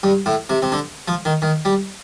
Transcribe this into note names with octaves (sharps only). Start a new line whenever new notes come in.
G2
A2
C3
C3
D3
F3
D#3
D#3
G3